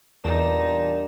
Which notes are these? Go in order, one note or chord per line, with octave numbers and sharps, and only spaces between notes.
E2 G2 A#2 D#4 G4 A5 E7